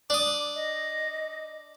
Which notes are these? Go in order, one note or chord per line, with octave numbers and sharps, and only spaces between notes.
D4 D6 D#6
D#5